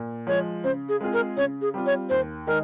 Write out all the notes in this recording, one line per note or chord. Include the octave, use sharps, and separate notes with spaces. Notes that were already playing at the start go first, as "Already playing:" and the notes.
Already playing: A#2
F3 G#3 C#5
C#3 C5
G#4
G#3 C4 F4 G#4
A#4
C#3 C#5
G#4
G3 C4 F4
C#5
D#2 C5
D#3 G#3 D#4 G#4 A#4